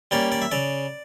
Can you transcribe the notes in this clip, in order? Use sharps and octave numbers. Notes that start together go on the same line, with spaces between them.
G3 A#3 C#4 D5
D5
E5
C#3 D5